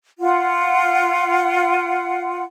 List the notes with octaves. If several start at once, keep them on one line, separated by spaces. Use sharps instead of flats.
F4 F#5